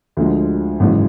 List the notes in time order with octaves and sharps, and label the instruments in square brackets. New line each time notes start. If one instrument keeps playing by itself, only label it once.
[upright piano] D2 D3 F3 G#3
G#1 F#2 C#3 E3 G#3